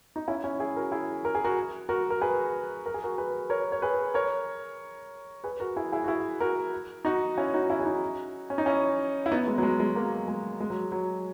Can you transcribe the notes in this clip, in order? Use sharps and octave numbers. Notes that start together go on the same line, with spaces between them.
D#4
C#4 E4
C#4 E4
E4 G#4
F#4 A#4
E4 G#4
A#4
G#4
F#4 A#4
F#4 A#4
A#4
G#4 B4
A#4
G#4
F#4 A#4
G#4 B4
A#4 C#5
C#5
G#4 B4
A#4 C#5
G#4 B4
F#4 A#4
E4 G#4
E4 G#4
F#4
E4 G#4
F#4 A#4
D#4 F#4
C#4 E4
D#4 F#4
C#4 E4
G#4
D#4 F#4
C#4
D#4
C#4 E4
E4
B3 D#4
G#3 B3
F#3
G#3
G#3
F#3 A#3
G#3
G#3
F#3
F#3